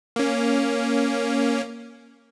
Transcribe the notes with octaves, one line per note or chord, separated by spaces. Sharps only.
A#3 C#4